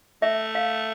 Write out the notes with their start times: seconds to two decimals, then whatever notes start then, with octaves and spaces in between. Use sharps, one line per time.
0.22 A3 E5
0.55 F5